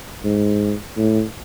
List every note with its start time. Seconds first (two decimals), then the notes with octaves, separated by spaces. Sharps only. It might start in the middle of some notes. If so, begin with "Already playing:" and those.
0.24 G#2
0.97 A2